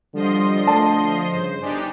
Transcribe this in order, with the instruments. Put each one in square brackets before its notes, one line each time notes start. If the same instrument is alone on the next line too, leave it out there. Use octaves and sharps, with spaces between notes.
[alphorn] D3 [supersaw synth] F3 D#5 C6 [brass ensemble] G3
[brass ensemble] A3 [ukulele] D5 A5
[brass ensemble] G2 C#3 [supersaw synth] C5
[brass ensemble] G1 G#5 [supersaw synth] D4 D#4 G4